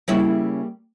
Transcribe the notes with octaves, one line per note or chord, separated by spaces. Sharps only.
C#3 G3 A#3 C#4 E4